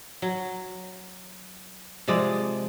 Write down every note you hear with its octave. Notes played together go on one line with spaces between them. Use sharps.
F#3
C3 F3 G#3 D5